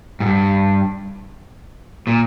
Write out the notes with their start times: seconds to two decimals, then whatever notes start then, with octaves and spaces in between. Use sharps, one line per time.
0.20 G#2
0.26 G2
2.07 A#2